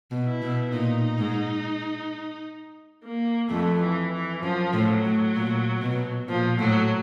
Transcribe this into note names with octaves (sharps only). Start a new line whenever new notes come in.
B2
E4
B2
A#2 D#4
G#2
A#3
F2 A3
E3
E3
F#2 F3
A2
F#3
A2
A#2
B2
A#2 F3
A2 F#3